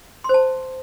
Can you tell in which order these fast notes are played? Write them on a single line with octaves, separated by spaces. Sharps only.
C6 C5 A5